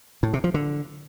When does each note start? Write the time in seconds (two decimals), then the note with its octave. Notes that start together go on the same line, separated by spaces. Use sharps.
0.23 A2
0.33 C3
0.44 F3
0.54 D3